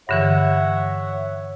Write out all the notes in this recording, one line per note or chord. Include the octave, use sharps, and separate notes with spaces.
G2 D3 E3 C#5 E5 F#5